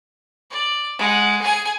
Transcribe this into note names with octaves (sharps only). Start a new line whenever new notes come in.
D5
G#3 F#5
G#4 G#5